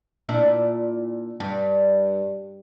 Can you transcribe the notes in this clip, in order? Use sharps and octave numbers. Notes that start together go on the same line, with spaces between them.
A#2 D4 E4
G2